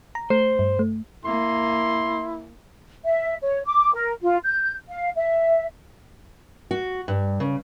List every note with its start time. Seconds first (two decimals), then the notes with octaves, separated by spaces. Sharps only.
0.15 A#5
0.30 A3 C5
0.59 G2
0.79 A3
1.25 A#3 E4 C6
3.05 E5
3.41 C#5
3.66 D6
3.94 A#4
4.23 F4
4.45 G6
4.89 F5
5.17 E5
6.71 F#4
7.08 G2
7.40 C#3